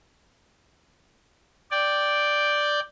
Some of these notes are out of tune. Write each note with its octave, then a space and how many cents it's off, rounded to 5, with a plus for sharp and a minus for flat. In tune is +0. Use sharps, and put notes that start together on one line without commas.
D5 +0 G5 +0